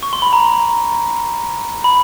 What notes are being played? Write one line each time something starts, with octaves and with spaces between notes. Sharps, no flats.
C#6
C6
B5
A#5
B5